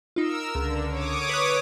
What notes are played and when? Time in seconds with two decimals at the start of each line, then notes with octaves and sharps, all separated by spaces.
0.16 D#4 F4 A#4 E6
0.55 C#2 D3
0.90 C#5 D6 D#6
1.29 B4 F#6